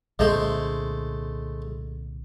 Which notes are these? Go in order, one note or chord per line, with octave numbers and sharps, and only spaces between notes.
C2 A#2 D3 G#3 A3 C5